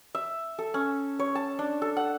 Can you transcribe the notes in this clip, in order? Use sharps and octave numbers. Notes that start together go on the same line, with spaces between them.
E5
A4
C#4
C#5
A5
D4
A4
F#5